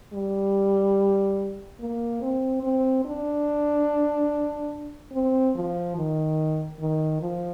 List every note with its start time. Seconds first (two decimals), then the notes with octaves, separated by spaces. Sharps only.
0.13 G3
1.80 A#3
2.22 C4
2.63 C4
3.05 D4
5.12 C4
5.55 F3
5.96 D#3
6.79 D#3
7.21 F3